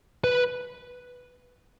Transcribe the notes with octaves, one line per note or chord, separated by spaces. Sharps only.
B4